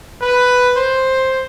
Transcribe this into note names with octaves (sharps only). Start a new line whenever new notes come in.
B4
C5